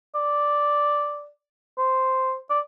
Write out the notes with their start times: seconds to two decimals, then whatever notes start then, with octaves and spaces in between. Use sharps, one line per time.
0.15 D5
1.78 C5
2.50 D5